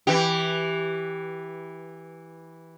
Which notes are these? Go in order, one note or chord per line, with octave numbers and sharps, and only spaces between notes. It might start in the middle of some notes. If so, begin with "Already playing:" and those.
E3 G4